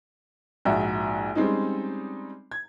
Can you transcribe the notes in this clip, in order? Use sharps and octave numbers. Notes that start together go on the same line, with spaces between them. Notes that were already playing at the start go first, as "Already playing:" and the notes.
A#1 G#2 F#4 E5
G3 G#3 C4 C#4 D#4
G#6